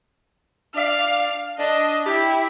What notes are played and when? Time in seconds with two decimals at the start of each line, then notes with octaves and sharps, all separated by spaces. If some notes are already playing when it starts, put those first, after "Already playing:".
0.75 D4 D5 F5
1.58 D4 D#5
2.05 E4 G4